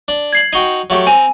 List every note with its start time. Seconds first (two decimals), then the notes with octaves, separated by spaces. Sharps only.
0.08 D4
0.33 G#6 C7 F#7
0.53 D#4 F#4 G5 D#7 G7
0.90 F#3 A3 G4
1.07 C4 G#5 A#5